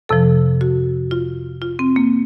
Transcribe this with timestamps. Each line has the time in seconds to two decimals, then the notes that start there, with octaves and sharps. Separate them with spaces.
0.09 F2 C3 F3 A4
0.61 F#4
1.11 F4
1.62 F4
1.79 C4
1.96 A#3